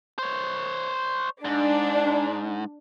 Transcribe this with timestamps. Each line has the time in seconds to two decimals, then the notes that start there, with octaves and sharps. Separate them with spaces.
0.19 C5 C#5
1.45 G#2 D4